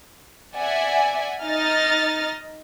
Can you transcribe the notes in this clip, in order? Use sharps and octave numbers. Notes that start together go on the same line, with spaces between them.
D5 E5 F#5 G#5
D#4 D#5 F6 A6